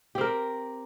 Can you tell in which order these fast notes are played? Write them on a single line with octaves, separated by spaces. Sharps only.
G4 C4 A#4